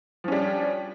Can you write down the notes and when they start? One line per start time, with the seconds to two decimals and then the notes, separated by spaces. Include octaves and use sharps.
0.24 F3
0.28 C#4
0.32 G3
0.36 D4